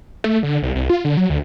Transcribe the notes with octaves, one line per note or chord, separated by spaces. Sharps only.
A3
D3
C2
C2
F4
D3
F#3
D2